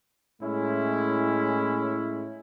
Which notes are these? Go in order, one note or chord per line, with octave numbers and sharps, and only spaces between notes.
A2 G#3 C#4 E4